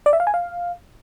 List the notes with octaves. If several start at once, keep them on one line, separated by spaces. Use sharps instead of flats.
D5
E5
F5
G#5
F5